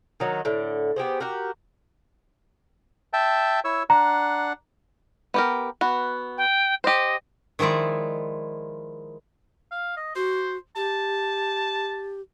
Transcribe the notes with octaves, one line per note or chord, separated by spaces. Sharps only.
D#3 F#3 D#4
A2 D3
B3 G4 G#4 C5
F#4 G4 A#4
E5 G5 A5
E4 C#5 E6
D4 F#5 A#5
B3 G4 A#4
B3 F#4
G5
G4 C5 D#5
D#3 F3 G#3 E4 D5
F5
D#5
F#4 C5
G4 A5